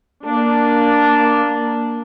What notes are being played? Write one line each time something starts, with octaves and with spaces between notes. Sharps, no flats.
A#3 D4